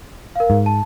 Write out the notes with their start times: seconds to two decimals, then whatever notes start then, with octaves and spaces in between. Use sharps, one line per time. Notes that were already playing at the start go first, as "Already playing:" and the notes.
0.36 A#4 F5
0.50 G#2
0.66 A5